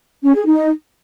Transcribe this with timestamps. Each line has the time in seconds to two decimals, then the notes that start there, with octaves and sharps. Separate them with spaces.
0.24 C#4
0.35 G#4
0.46 D#4